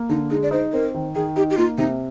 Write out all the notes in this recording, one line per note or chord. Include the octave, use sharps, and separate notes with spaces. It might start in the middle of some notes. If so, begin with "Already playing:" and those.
Already playing: A#3
D3 D#4
G#3 D#4
D5
D#4 C5
C4 A#4
D#3
D#3 G#4
D#4 G4
G4
A#3 F4
C3 D#4